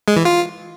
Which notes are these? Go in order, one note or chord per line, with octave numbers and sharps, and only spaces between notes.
G#3
E3
F4